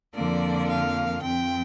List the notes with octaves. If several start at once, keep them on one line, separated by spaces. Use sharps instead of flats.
F2 D3 F3 A#3 D5
F5
F2 F3 C4 G5